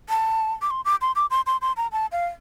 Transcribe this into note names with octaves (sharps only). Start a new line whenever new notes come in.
A5
D6
C6
D6
C6
D6
C6
C6
C6
A#5
A5
F5